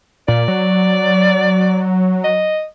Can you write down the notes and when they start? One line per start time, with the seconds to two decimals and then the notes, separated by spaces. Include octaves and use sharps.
0.28 A#2 D5
0.48 F#3
2.24 D#5